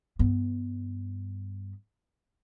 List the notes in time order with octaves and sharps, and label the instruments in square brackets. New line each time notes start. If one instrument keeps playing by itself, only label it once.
[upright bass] G2 B3